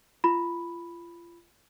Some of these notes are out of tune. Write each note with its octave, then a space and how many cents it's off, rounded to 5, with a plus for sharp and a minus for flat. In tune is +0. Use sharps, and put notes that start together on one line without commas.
F4 -30 B5 +0